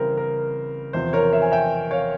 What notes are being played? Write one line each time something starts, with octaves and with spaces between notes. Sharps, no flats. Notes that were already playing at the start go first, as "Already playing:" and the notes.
Already playing: C#3 E3 G3 C4 A#4 C5
A#4
E2 C3 F3 C5
A#4 C#5
C5 E5
G#5
E5 G5
C#5 F5